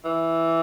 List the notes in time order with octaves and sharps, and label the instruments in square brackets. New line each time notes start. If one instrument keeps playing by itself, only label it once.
[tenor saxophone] E3